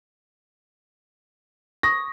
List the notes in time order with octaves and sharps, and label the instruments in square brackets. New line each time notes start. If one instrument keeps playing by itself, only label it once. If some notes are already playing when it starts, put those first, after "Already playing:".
[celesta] C#6 D#6 [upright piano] A#6